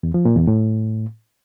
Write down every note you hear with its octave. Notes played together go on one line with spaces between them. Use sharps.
E2
F3
A#2
E2
A2